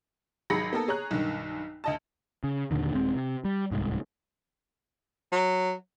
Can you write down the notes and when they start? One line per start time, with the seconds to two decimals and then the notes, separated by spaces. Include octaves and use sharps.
0.50 G#1 F#3 G#4 B5 A#6 C#7
0.73 A#3 B3 A4
0.88 G#4 C#5 A#5 F#6
1.11 B1 G2 D#3
1.84 D2 D#5 A5
2.44 C#3
2.71 D#2 A#2 D3 D#3
2.93 D#1 G#3 C4
3.15 C3
3.45 G3
3.71 D1 C2 G#2
5.32 F#3